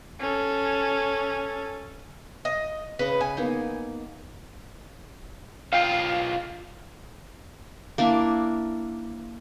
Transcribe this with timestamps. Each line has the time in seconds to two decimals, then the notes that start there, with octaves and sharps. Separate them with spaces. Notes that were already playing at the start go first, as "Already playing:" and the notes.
0.20 C#4 A4
2.45 D#5
2.99 C#3 B4 D#5
3.21 G#5
3.37 A#3 B3 D#4
5.73 B1 F4 F5 G5 C7
7.98 A#3 D4 E4